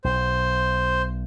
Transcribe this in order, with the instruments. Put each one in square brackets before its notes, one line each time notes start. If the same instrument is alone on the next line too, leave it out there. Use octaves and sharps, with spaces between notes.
[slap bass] B1 [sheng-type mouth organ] C5